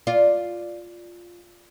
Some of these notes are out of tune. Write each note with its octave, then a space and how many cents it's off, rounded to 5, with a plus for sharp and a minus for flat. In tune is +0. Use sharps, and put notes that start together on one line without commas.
F4 +0 D5 +0